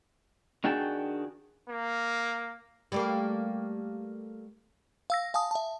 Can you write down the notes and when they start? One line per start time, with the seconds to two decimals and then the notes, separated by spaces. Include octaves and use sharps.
0.64 D#3 D4 F#4 G#4 G5 A5
1.69 A#3
2.92 G3 A3 A#3
5.10 F5 E6 A#6
5.34 F5 G#5 A5 D#6
5.51 E5 A5